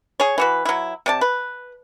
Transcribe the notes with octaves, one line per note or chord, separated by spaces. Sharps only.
G#4 C#5
E3 F#4 B4
F#3 E4
C3 D5 A5
B4